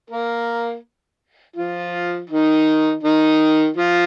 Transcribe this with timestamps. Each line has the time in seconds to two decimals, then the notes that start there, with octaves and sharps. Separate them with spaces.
0.10 A#3 A#4
1.56 F3 F4
2.29 D#3 D#4
3.03 D#3 D#4
3.76 F3 F4